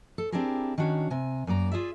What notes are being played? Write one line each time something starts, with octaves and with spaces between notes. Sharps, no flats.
A4
C4 D4 E4 G4 G#4 A#4
D#3 C#4 D4 F#4 B4 C#5
C3 G#5
F#2 A#3 D5 A#5
F4 G#4 D5 E5